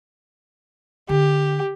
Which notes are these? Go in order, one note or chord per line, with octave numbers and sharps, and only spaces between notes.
D3 G4